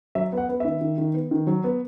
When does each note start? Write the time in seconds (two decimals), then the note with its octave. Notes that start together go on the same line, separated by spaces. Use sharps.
0.15 F#3 E5
0.32 B3
0.37 F#5
0.49 B3
0.60 D#3 E5
0.81 D#3
0.98 D#3
1.14 B3
1.31 D#3
1.47 F#3
1.64 B3